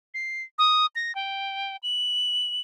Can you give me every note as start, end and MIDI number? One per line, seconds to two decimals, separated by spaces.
0.14 0.42 96
0.58 0.86 87
0.96 1.14 94
1.15 1.77 79
1.83 2.61 102